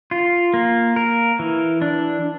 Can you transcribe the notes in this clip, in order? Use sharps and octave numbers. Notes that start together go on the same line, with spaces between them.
F4
A#3
A#4
E3
D4